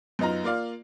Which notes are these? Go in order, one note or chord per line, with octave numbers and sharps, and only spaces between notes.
F#2 B3 D#4 F4 A#5
A#3 F4 D5 F5